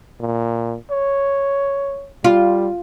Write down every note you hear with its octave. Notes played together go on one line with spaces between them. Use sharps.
A#2
C#5
G3 F4